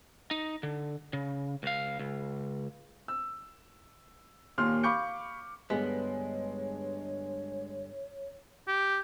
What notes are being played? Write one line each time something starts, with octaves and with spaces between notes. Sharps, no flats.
D#4
D3
C#3
C#2 F5
C#2
E6
D#2 A#2 C6 F6
F5 B5 C#6 D6 G6 C#7
G2 D3 G3 G#3 B3 C#5
G4